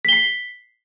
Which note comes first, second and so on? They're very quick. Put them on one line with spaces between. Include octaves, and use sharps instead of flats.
B6 G7 C7